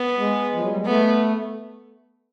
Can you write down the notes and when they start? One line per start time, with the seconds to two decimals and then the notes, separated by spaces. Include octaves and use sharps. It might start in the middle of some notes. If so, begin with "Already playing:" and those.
Already playing: B3
0.18 G#3
0.53 F3
0.61 F#3
0.69 G3
0.77 G#3
0.85 A3 B3